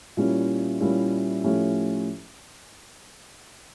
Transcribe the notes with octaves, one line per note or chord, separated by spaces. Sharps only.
A#2 G3 A#3 C#4 E4
A#2 G3 A#3 C#4 E4
A2 F3 C#4 G4